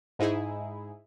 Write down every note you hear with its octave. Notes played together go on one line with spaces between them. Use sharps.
G#2 D#4 E4 G#4